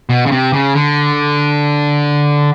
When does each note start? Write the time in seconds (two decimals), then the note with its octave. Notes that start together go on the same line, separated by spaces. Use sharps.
0.09 B2
0.26 C#3
0.32 C3
0.53 C#3
0.75 D3